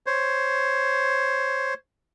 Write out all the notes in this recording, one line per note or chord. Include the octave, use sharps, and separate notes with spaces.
C5 C#5